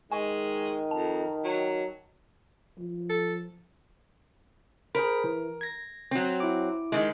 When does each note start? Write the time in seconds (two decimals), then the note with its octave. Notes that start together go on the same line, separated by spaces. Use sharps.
0.12 D#3 G#3 G#5 C#6
0.91 F2 A5
1.44 F#3
2.78 F3
3.09 A4
4.95 G#4 A#4 C5 B5
5.24 E3
5.61 G#6 A#6
6.11 F#3 C4
6.40 E4 D6
6.92 D#3 G#3